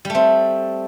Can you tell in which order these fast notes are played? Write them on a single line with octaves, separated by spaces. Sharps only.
G3 A3 C4